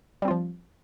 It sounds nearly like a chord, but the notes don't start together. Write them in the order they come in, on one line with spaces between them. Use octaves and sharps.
G3 C4 F4 F3